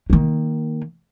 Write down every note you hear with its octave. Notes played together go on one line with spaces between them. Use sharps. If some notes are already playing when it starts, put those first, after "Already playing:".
D#3 A#3